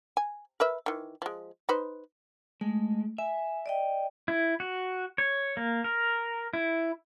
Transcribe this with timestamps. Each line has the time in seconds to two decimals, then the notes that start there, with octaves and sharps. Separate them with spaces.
0.17 G#5
0.60 A#4 B4 E5
0.86 D#3 E3
1.22 F3 G#3
1.69 D#4 B4 C5
2.61 G#3 A3
3.18 E5 G#5
3.66 D5 D#5 G5
4.28 E4
4.60 F#4
5.18 C#5
5.57 A#3
5.84 A#4
6.53 E4